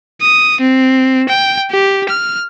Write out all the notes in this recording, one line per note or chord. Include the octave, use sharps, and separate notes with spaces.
D#6
C4
G5
G4
F6